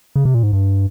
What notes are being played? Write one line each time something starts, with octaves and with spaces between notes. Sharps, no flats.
C#3
C3
A#2
G#2
G2